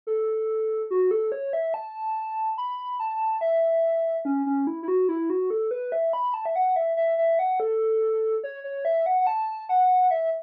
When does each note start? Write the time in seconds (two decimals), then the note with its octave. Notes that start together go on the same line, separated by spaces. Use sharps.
0.07 A4
0.91 F#4
1.11 A4
1.32 C#5
1.53 E5
1.74 A5
2.58 B5
3.00 A5
3.41 E5
4.25 C#4
4.46 C#4
4.67 E4
4.83 E4
4.88 F#4
5.09 E4
5.30 F#4
5.50 A4
5.71 B4
5.92 E5
6.13 B5
6.34 A5
6.45 E5
6.56 F#5
6.76 E5
6.97 E5
7.18 E5
7.39 F#5
7.60 A4
8.44 C#5
8.64 C#5
8.85 E5
9.06 F#5
9.21 F#5
9.27 A5
9.69 F#5
10.11 E5